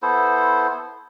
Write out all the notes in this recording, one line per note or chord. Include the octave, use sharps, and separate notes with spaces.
B3 E4 A4 C5